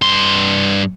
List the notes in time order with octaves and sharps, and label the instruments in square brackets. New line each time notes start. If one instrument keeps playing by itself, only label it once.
[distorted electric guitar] G2 C6